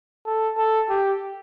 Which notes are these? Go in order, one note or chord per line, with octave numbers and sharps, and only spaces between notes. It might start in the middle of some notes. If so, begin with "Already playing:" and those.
A4
A4
G4